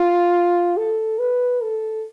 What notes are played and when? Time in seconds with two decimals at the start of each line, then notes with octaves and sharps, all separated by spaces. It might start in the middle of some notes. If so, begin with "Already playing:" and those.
Already playing: F4
0.77 A4
1.19 B4
1.62 A4